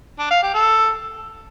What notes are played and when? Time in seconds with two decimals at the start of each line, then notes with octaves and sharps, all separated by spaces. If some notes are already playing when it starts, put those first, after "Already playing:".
0.19 D4
0.31 F5
0.42 G4
0.54 A4